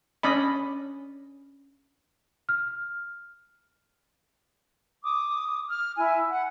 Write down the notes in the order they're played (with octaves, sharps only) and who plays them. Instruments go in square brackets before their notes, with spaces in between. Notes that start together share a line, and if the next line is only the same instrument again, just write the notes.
[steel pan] C#4 D4 D#5 B5
[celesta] F6
[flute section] D6 D#6
F6
E4 G#5
F#5 F#6